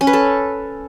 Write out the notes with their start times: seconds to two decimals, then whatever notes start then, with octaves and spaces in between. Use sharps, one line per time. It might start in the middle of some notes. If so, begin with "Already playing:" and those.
0.01 C#4
0.07 B4
0.13 A4